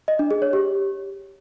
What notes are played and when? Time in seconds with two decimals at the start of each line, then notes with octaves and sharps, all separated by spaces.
0.08 D#5
0.19 D4
0.31 G#4
0.42 C#5
0.53 G4